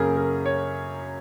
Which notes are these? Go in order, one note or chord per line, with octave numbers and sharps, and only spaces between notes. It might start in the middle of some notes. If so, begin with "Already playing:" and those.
Already playing: F#2 C#3 A#3 C#4 G#4 A#4
A#4
C#5